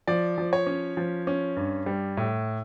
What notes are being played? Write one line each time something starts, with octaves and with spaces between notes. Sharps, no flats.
F3 D5
F3
C#5
C#4
F3
C#4
G2
G3
A2